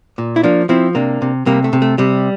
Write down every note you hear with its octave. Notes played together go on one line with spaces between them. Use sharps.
A#2
E4
F3 A#3 D4
F3 C4 E4
C3 A#3 D4
C3
C3 G3 A#3
A3
C3
A3
C3 G3